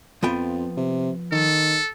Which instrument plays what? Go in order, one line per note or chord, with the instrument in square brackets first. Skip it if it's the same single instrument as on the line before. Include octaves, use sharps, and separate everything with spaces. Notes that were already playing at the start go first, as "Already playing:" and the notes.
[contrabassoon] F2 [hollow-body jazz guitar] F3 B3 G5
[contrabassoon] C3
[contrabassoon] D#3 [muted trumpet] A4